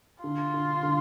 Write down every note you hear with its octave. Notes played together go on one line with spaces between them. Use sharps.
D3 F4
D3
D3